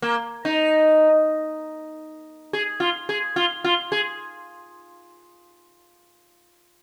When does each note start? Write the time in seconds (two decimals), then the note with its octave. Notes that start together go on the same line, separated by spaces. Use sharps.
0.02 A#3
0.45 D#4
2.53 G#4
2.80 F4
3.09 G#4
3.36 F4
3.64 F4
3.92 G#4